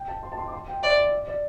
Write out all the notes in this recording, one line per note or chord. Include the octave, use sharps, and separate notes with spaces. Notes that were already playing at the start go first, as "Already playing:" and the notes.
Already playing: G5
A5
C6
A5
C6
D6
C6
G5
D5 E5
D5
D5
D5